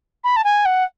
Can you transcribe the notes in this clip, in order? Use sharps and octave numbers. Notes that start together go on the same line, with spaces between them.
B5
A5
G#5
F#5